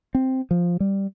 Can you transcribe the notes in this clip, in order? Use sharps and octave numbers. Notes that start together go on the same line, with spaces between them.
C4
F3
G3